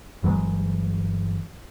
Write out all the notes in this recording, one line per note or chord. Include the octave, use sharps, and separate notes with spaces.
G1 E3 F#3 G#3